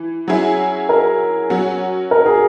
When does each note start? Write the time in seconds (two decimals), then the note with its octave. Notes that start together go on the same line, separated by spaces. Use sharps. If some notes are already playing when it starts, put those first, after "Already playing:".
Already playing: E3
0.28 F#3 C#4 E4 G#4
0.89 A#4
1.50 F#3 C#4 F#4
2.11 A#4
2.26 G#4